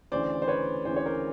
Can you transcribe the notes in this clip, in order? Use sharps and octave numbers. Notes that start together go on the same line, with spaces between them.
D2 C#3 E3 C5 D5
C5
B4 C#5
D2 C#3 E3 C5
C#5
A#4 C5